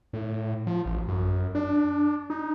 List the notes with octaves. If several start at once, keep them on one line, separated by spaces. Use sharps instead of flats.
A2
F3
A1
F#2
D4
D#4